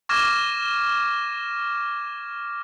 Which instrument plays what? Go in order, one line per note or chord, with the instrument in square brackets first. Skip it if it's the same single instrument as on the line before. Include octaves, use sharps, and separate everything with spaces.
[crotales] C#6 D6 F6 G#6 A#6 E7